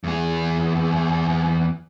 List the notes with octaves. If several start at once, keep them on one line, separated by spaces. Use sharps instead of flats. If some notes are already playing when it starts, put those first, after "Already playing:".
E2 G#4